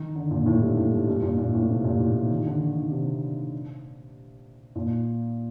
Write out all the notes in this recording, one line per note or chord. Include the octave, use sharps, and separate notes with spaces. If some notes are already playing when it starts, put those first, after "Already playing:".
Already playing: D#3
D3
A#2
A2
G2
A2
G2
G2
A#2
A#2
A2
C3
A#2
A2
C3
D#3
D3
D#3
D#3
C3
A#2